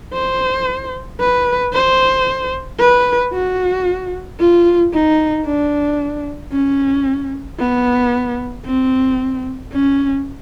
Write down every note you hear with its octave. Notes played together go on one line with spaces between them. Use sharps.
C5
B4
C5
B4
F#4
F4
D#4
D4
C#4
B3
C4
C#4